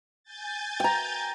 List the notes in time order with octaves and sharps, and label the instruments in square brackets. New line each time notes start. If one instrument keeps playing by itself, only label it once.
[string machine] G#5 G6 A6
[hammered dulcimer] G5 A#5